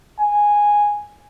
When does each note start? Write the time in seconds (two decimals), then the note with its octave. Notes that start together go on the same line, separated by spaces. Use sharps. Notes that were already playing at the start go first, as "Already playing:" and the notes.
0.20 G#5